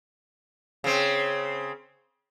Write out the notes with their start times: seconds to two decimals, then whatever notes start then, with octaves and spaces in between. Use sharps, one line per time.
0.84 C#3 C4